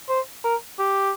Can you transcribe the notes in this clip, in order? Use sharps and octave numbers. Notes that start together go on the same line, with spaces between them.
C5
A#4
G4